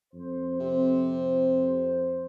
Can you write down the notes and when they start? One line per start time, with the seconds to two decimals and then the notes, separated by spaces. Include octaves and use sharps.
0.13 F2 C5
0.60 C3